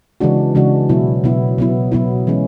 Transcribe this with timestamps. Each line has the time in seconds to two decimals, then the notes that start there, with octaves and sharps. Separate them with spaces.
0.20 C#3 E3 G#3 D4 F#4
0.55 C#3 E3 G#3 D4 F#4
0.89 B2 F#3 B3 E4
1.24 B2 F#3 B3 E4
1.58 B2 F#3 B3 E4
1.92 B2 F#3 B3 E4
2.27 E3 G#3 C#4